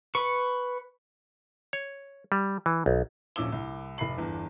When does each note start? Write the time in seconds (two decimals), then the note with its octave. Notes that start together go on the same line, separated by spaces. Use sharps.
0.15 B4 C#6
1.73 C#5
2.32 G3
2.66 E3
2.86 B1
3.36 D#1 A#1 C#4 D6 E6 G7
3.52 C2
3.98 F1 B5 C7 F#7
4.18 G1 E2